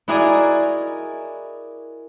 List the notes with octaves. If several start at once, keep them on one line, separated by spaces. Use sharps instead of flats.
E4 F#4 G#4 A#4 D5 D#5